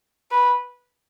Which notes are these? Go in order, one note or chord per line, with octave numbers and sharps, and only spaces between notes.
B4